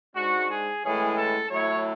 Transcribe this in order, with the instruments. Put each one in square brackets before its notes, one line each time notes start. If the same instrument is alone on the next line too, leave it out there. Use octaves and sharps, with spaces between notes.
[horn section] G#2 G#3 D4 F#4
G#4
A2 E3 G#3 C#4 G#4
A4
A2 F#3 A3 E4 C#5